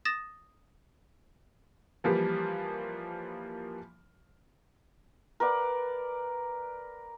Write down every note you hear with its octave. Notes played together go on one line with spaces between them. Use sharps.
D#6 A6 A#6 E7
E3 F3 G3 A#3
A#4 B4 D5 F#5